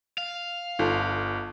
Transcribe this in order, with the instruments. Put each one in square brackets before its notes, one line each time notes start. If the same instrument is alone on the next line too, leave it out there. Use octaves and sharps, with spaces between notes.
[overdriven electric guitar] F5
[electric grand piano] G1 [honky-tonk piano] F4 A4